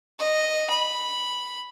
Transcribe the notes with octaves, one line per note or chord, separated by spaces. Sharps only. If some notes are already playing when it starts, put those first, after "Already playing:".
D#5
B5